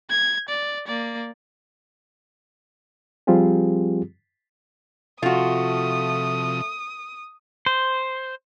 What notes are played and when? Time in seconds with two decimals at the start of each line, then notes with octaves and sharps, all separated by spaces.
0.10 G#6
0.49 D5
0.87 A#3 D5
3.27 F3 G3 C4 F4 G4 G#4
5.23 C3 F3 A3 F4 F#4 D#6
7.66 C5